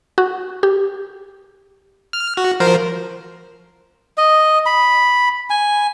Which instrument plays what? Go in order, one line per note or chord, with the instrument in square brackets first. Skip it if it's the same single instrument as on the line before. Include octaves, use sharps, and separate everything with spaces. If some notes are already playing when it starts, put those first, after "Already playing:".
[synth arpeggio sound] F#4
G4
[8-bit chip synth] F6
F#4
F3 A#4 C5
[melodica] D#5
B5
G#5